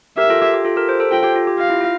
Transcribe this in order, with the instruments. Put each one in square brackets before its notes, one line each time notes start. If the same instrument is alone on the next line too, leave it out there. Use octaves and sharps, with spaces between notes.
[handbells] G4 A#4 [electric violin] E5
[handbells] F4 A4
G4
G4
F4 A4
G4 A#4
A4 C5
A4 C5
[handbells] F4 A4 [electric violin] G5
[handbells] G4
F4
G4
[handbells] F4 [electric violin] F5
[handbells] E4
F4